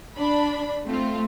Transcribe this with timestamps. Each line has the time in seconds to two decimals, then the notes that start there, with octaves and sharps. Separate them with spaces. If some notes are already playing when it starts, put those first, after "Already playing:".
0.17 D4 B5
0.86 A3 C4 F4